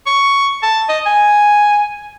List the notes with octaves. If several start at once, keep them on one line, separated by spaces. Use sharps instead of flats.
C#6
A5
D#5
G#5